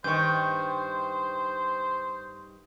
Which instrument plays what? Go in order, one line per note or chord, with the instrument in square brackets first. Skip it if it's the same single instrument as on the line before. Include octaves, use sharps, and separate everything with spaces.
[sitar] G2 D#3 [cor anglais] C5 [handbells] C#6 G6